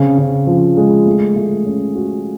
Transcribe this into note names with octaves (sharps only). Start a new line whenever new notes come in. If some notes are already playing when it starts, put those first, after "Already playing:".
Already playing: C#3 C4
C#3
F3
G#3
A3
A3
C#4
F#4